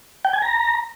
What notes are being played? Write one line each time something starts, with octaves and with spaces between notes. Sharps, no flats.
G5
G#5
A#5